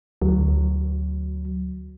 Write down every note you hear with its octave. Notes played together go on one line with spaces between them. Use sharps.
D2 F#3